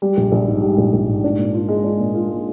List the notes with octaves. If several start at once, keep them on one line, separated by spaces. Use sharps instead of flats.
G3
A#1
A#1
G#2
G3
A#1
A#1
G#2
D4
A#2
F4
G#3
D4
A#2
F4
G#3